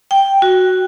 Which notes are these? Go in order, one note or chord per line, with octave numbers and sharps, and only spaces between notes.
G5
F#4